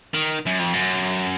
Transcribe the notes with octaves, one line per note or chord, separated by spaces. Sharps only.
D#3
F#2
F2
F#2